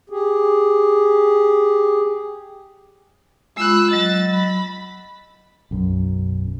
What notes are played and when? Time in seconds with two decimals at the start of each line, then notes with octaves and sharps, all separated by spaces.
0.10 G4 G#4
3.57 G#3 F4 B5 E6 F#6
3.90 F#3 D#5 A6
4.34 B5
5.71 B1 F#2